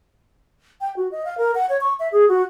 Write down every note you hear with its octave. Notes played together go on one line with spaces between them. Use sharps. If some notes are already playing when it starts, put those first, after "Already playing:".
G5
F#4
D#5
F5
A#4
F#5
C#5
C#6
E5
G#4
F#4